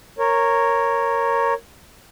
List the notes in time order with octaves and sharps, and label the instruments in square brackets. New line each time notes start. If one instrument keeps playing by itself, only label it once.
[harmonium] A#4 C#5